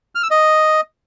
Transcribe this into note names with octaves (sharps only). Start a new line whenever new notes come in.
F6
E6
D#5